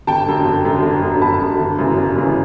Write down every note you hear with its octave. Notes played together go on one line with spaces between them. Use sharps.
G1 G5 A5
F#2 D3
G1
F#2 D3
G1
F#2 D3
G1 A5 B5
F#2 D3
G1
F#2 C#3 E3
G1
F#2 C#3 E3